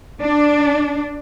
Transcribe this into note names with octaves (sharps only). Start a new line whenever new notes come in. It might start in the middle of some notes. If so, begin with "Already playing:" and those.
D4